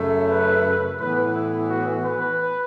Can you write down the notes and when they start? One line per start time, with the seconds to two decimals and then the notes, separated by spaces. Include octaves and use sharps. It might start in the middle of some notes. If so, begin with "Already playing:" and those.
Already playing: F#2 C#3 A3
0.32 B4
1.01 A2 E3 B3 B4
1.35 E4
1.70 F#4
2.05 B4